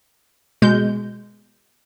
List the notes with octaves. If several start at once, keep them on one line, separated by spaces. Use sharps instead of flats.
B2 G#3 G6